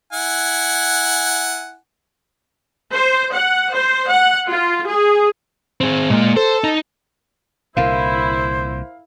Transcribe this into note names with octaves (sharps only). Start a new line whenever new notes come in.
E4 F#5 G#5
C5
F#5
C5
F#5
F4
G#4
C4 G#4
A#2 G#3 A#3
A4 C5
D#4
C2 A#2 D3 E4 A#4 C5 F5